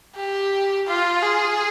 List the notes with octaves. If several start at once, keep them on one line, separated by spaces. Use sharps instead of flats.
G4
F4
G#4